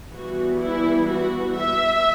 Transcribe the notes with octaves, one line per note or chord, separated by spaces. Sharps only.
E3 G3 B3 F#4
E4
F#4
E5